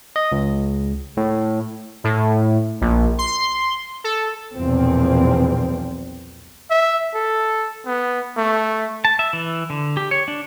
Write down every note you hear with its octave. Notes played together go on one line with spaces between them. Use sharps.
D#5
C#2
A2
A2
A#1
C6
A4
B1 E2 A#2 F3 C4
E5
A4
B3
A3
A5
E5
E3
D3
G4
C#5
D4